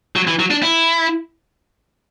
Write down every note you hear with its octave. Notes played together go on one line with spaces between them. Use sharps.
F#3
E3
F#3
D4
E4